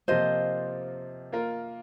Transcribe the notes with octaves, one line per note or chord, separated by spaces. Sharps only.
C3 F3 A#3 F4 C5 D#5
A#3 F4 A#4